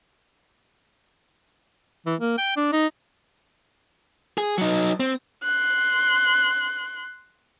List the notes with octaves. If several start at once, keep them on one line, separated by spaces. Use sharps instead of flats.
E3
A#3
G5
D4
D#4
G#4
F#3 D#4
C4
C6 F#6